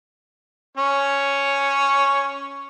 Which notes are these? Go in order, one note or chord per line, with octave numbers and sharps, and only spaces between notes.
C#4 C#5